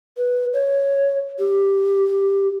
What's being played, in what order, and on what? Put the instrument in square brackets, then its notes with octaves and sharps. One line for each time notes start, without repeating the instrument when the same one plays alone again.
[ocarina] B4
C#5
G4